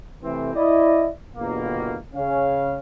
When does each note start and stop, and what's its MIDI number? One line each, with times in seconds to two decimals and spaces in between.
0.23 0.52 48
0.23 0.52 52
0.23 0.52 57
0.23 0.52 60
0.54 1.08 64
0.54 1.08 74
0.54 1.08 75
1.35 1.96 31
1.35 1.96 40
1.35 1.96 47
1.35 1.96 58
2.14 2.78 49
2.14 2.78 61
2.14 2.78 77